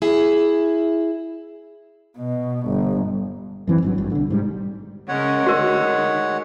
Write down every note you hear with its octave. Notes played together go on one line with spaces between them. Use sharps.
E4 G#4
B2
G1
F#2 E3 C4
G#1 G2 F#3
G#1 G2
B1 D3
G#2 E3 G3
C#3 G#3 C#4 A#4 C#5 F#5
D2 D#3 F#4 A#4